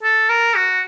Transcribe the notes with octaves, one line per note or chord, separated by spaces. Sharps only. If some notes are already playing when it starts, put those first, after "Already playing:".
A4
A#4
F#4